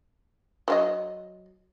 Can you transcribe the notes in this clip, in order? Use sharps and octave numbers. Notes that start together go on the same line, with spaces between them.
F#3 F4 D#5